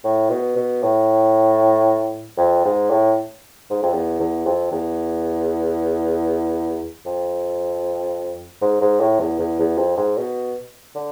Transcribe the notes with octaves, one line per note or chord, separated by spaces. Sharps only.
A2
B2
B2
A2
F2
G#2
A2
G#2
F2
E2
E2
F2
E2
F2
G#2
G#2
A2
E2
E2
E2
F2
G#2
B2
D3